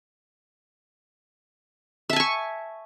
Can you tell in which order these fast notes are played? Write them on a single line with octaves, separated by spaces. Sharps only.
E5 A5 G#5 C#6